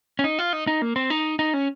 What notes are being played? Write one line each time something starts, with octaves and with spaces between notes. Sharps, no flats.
C#4
D#4
F4
D#4
D#4
A#3
C4
D#4
D#4
C#4